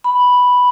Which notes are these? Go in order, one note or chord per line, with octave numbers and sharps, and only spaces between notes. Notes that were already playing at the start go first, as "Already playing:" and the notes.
B5